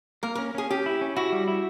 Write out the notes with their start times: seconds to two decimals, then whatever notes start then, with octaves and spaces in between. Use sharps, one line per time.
0.23 A#3 A#4
0.35 C#4 A#4
0.55 C#4 G#4
0.70 C#4 G4
0.86 E4
1.01 C#4
1.16 E4 F#4
1.32 G3
1.48 E4